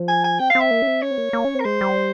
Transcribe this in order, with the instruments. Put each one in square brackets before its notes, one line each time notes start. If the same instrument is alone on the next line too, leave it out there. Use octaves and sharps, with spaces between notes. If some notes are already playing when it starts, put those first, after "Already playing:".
Already playing: [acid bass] F3
[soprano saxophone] G#5
G#5
[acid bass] C4 [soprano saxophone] G5
[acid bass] C4 [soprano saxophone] F5
[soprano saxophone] E5
[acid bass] A#3
C#4
C4
[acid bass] C#4 [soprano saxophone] C#5
[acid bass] C4
A#3
A#3
C#4
C4
[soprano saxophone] A#4
[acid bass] G#3 [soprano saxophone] C5
[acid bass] G3